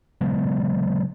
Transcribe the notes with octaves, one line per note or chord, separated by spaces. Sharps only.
C#3 F#3 G#3 B3